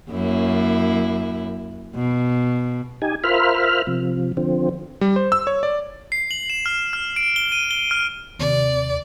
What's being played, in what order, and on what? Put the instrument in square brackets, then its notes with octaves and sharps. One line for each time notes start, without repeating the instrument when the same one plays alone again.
[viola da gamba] F#2 A#3 E4
B2
[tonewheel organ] D#4 G4 G#5
F4 A#4 C5 E5 B5 F6
C3 F3
D3 F3 C4
[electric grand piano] G3
C5
E6
C#5
D5
[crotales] C7
F#7
E7
F6
F6
D7
G7
D#7
G7
F6
[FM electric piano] D#2 C3 [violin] D5